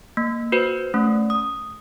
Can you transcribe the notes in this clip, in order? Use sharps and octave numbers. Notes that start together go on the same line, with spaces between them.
A#3
F#4 B4 C5
A3 C#4
D#6